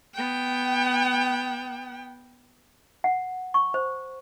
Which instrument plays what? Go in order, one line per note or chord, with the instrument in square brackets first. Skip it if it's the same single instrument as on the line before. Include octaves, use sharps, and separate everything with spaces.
[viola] B3 G5
[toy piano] F#5
C#6
C5